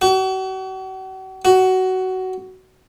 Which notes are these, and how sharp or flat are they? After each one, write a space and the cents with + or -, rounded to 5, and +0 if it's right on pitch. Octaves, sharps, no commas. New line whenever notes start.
F#4 +40
F#4 +15